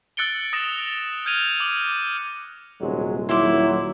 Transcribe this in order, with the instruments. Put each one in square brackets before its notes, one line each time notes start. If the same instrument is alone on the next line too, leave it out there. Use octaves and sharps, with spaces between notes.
[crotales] E6 F#6 A6 C#7 D7 G7
D#6 A6 A#6 D7 E7 F7
F6 G6 G#6 D#7 F7
D6 F#7
[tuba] D#1 [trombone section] C3 F#3 G#3
[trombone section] D#2 F#3 [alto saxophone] E4 [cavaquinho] C6 D6